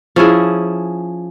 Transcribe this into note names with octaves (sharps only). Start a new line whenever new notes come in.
F3 C#4 E4 G#4